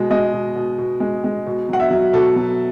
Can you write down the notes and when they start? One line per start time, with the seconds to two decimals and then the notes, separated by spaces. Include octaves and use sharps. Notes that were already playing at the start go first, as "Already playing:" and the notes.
Already playing: B2 G#3
0.11 G#3 D#5
0.33 B2
0.56 B2
0.78 B2
1.00 G#3
1.24 G#3
1.47 B2
1.69 F#3 F#5
1.80 E5
1.91 F#3
2.13 B2 A4
2.36 F#3